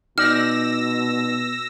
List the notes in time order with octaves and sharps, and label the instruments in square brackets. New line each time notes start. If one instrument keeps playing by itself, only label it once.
[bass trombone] B2 [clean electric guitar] D#4 D5 [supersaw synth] E6 A#6 [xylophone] F6